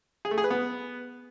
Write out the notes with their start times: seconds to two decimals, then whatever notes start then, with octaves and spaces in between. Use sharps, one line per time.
0.25 G#4
0.31 A3
0.38 G#4
0.44 B4
0.50 B3